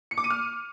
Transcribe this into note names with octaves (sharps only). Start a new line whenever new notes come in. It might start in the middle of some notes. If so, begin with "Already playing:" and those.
C#7
D6
D#7
F6